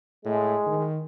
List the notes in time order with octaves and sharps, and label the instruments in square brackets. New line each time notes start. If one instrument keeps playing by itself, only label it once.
[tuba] A2 [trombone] G#3
[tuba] D#3